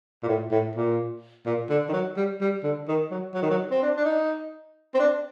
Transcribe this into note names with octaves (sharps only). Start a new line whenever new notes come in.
A#2
A2
A2
A#2
A#2
D3
D#3
F#3
G3
G3
D3
D#3
F#3
F#3
D#3
F#3
C4
D4
D4
D#4
C4
D4